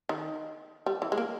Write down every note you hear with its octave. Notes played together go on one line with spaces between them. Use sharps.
D#3
G3
E3
G#3
A#3